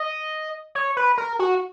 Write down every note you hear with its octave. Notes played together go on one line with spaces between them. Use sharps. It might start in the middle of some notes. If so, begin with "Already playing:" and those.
Already playing: D#5
C#5
B4
A#4
F#4